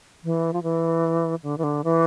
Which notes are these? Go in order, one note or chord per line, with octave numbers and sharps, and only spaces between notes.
E3
F3
E3
D3
E3
D3
E3